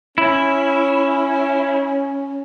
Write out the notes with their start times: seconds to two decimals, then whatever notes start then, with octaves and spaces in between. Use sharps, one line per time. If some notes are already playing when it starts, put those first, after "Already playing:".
0.18 C#4 E4